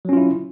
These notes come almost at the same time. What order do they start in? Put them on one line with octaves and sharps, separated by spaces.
F#3 C#4 F4 E4